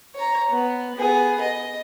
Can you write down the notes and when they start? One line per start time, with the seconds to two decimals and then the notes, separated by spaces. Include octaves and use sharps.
0.15 C#5 A#5
0.50 B3
0.95 B3 G#4
1.41 D#5